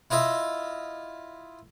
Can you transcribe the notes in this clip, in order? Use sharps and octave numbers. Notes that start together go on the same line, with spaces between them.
E4 F4 D#5 E5